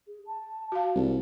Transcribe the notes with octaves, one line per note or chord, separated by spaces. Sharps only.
G#4
A5
F#4 F5
C2 D5